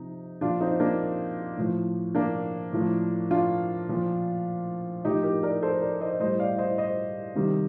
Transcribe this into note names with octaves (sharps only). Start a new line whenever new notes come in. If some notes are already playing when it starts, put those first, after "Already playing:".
Already playing: C3 F3 D#4
A#2 F3 D4 F4
C4 D#4
A#3 D4
A2 F3
A#3 D4
A2 F3
D4 F4
A#2 F3
A2 F3 D#4 G4
G4 A#4
A#4 D5
A4 C5
A#4 D5
C5 D#5
A2 G3 C5 D#5
D5 F5
C5 D#5
C5 D#5
C3 D#3 G3